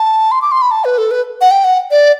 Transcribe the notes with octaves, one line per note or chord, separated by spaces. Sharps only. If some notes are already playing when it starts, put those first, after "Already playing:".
Already playing: A5
C6
D6
C6
B5
A5
B4
A4
B4
F#5
G5
F#5
D5